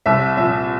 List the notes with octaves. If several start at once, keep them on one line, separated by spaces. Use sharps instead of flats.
C2 E5
A#2 F3 E5